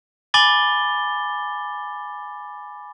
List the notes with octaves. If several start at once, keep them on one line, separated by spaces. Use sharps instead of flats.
G#5 B5 D6 A6 G7